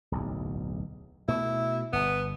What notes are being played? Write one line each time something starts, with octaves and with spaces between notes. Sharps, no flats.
D1 B1 E2
B2 A3 E4
G1 B3